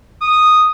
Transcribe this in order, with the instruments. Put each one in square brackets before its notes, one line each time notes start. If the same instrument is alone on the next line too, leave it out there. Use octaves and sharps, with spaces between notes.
[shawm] D#6